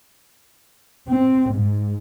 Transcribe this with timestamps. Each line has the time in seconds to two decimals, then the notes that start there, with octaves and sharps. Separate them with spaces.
1.09 C4
1.52 G#2